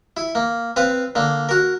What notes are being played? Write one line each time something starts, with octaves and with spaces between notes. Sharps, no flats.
E4
A#3
C4 B4 F5
D3 A#3
F#4 A#4